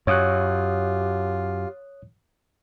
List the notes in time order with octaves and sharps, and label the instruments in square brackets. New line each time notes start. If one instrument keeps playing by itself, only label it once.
[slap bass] F#2 [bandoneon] F4 [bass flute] G4 [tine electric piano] C#5 D#6 F#6